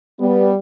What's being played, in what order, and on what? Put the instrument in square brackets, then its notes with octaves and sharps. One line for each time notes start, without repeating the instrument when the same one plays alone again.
[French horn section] G3 B3